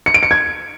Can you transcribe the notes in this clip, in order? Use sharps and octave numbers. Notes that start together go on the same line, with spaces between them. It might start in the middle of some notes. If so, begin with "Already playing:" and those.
C#7
D7
C#7
G#6